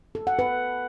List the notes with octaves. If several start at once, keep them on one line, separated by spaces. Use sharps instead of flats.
A4
F#5
B4